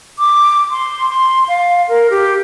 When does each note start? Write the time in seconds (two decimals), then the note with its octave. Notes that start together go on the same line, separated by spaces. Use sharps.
0.19 D6
0.71 C6
1.09 C6
1.48 F5
1.89 A#4
2.10 G4